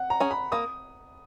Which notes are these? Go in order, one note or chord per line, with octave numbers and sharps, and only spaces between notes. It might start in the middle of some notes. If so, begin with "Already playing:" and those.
Already playing: F#5
A#5
C#4 G#4
B5
A#3 D#6